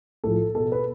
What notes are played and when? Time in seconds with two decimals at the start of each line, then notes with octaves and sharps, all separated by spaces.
0.24 A2 F3 A4
0.55 B2 A4
0.72 B4